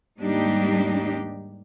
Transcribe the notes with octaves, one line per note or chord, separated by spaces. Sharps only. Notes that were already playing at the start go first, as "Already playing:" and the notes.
D#2 G#2 G3 D4 D#4 G4